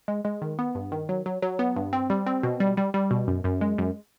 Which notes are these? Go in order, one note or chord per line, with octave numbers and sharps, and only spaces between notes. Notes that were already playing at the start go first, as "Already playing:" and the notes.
G#3
G#3
D#3
B3
G2
D#3
F#3
F#3
F#3
B3
G2
C4
G3
C4
B2
G3
G3
G3
B2
F#2
F#2
G#3
F#2